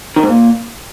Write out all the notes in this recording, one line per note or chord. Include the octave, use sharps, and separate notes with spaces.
D#3
G#2
A#2